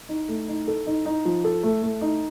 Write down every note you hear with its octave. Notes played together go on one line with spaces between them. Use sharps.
D#4
A3
D#4
A4
D#4
D#4
F3
A4
A3
A3
D#4